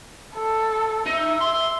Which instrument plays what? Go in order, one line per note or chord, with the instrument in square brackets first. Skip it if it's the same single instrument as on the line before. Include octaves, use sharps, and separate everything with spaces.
[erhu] A4
[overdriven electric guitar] D#4 [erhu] E5
[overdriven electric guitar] C6